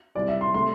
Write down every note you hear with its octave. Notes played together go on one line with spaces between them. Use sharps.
C3 G3 E4 D5
E5
C6
C3 A3 C6